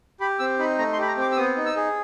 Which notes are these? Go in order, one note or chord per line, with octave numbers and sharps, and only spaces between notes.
G4 B5
C4 E6
D#4 B5
A3 A#5
C6
G4 B5
A#5
C4
D6
E6
B3 D#6
D#4
E6
G#4